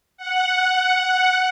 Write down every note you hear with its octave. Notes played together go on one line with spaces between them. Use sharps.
F#5